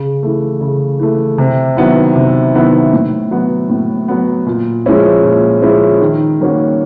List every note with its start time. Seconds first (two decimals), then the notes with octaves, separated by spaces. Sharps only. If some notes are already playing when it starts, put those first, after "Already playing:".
Already playing: C#3
0.23 E3 A3
0.61 C#3
0.99 E3 A3
1.38 C3
1.77 D#3 F#3 B3 E4
2.16 C3
2.54 D#3 F#3 B3 E4
2.93 A2
3.31 F#3 B3
3.69 A2
4.08 F#3 B3
4.46 A#2
4.86 F3 G#3 C#4 E4
5.25 A#2
5.62 F3 G#3 C#4 E4
6.01 D#3
6.40 G3 A#3 C#4 F#4